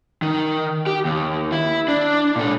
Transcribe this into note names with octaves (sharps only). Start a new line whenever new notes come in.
D#3
G4
D#2
E4
D4
A#2 A4